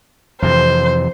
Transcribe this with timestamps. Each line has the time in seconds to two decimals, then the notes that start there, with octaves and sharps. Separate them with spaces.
0.42 F2 C3 E3 C5